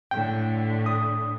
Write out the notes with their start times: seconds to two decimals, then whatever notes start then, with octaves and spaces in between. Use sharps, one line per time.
0.11 A2 D3 G5
0.86 D#6